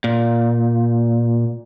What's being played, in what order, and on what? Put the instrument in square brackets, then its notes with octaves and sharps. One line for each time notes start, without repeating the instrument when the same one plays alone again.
[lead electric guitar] A#2